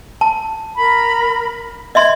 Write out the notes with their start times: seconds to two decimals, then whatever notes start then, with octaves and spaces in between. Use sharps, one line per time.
0.21 A5
0.76 A#4 B5
1.95 D#5 E5 C6 G6 G#6